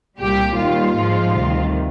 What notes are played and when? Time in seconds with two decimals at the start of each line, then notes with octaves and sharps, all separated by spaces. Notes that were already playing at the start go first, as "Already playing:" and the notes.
0.18 C2 A#2 G3 G4
0.57 D#2 D#3 G3 F4
0.95 G#2 F3 G#3
1.34 D2 C3 D#3 G3